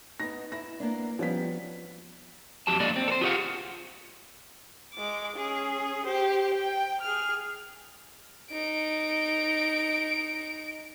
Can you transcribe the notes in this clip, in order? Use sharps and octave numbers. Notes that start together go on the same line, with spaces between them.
B3 D#4 A#6
E4 A#6
A#3 B3 D4
F3 G3 B3 C#4 B6
F2 F#3 G4 A5
F2 D3 A#3 D5 D#5
C4
A4 C5
F4 G4 G#4 D#5 F5 F#5
G#3 D6
C#4 G#4
G4 C5
G5
G#4 F6
D#4 D7